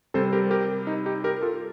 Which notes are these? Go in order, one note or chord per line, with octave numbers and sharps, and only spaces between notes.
C3 G3 C4 A4 C5
G4 A#4
G4 A#4
D#4
D#4 G4
G4 A#4
F4 A4